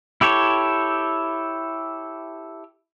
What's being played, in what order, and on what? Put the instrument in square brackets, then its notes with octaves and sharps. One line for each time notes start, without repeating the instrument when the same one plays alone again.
[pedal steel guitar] E4 G4 A4 C#5